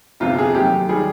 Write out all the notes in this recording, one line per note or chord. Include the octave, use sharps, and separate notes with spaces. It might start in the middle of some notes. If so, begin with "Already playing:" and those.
G1 F2 C3 F3 F4
G#4
D#2 D#3 F#3 A3 G4
D#3 G3 G#4